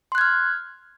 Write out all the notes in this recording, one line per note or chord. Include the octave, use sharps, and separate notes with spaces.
C6 F6 F#6 G#6